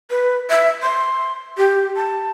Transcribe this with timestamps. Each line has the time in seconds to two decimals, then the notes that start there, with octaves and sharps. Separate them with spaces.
0.10 B4
0.50 E5
0.82 C6
1.57 G4
1.96 A5